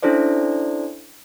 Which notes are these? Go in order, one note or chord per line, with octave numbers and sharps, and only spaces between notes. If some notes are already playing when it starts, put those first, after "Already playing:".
C#4 D4 E4 A4 C5 D5